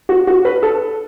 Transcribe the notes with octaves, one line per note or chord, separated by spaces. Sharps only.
F#4
F#4
B4
A4